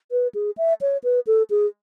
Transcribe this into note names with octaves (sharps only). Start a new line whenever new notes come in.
B4
G#4
E5
C#5
B4
A4
G#4